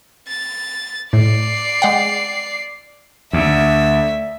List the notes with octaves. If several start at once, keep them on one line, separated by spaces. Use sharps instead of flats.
A6
A2 D5 C7
G#3 F#5 G5
D2 E5